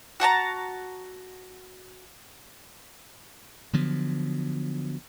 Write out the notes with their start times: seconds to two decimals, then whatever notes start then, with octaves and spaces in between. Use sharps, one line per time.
0.20 F#4 F#5 A5 A#5
3.73 D3 F3 F#3 B3